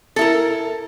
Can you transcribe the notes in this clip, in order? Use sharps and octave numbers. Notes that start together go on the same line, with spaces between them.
E4 A4 A#4